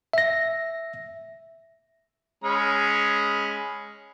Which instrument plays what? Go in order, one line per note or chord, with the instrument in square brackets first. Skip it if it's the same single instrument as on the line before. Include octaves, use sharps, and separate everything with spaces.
[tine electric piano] E5 A#6
[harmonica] G#3 C#4 B5